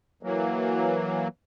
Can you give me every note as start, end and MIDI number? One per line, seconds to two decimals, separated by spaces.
0.23 1.28 52
0.23 1.28 54
0.23 1.28 58